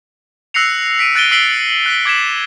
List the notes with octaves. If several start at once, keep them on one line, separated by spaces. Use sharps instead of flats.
E6 F#6 A#6 C7 C#7 F7
B6 D7 D#7
F#6 A6 D7 D#7 G7
E6 B6 C7 D7 F#7 G7
F#6 B6 G7
D6 G#6 B6 E7